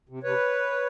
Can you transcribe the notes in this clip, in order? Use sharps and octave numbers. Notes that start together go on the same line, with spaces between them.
C3
C3 B4 C#5